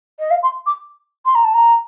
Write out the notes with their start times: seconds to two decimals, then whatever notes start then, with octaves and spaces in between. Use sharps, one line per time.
0.19 D#5
0.30 F5
0.42 C6
0.66 D6
1.25 C6
1.35 A#5
1.44 A5
1.54 A#5